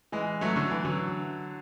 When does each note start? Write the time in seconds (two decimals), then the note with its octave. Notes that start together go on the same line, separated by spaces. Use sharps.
0.12 E3 G#3
0.41 F#3 A3
0.56 D3 F#3
0.71 E3
0.85 D3 F#3